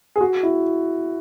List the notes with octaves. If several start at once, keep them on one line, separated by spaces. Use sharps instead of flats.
G#4
F#4
E4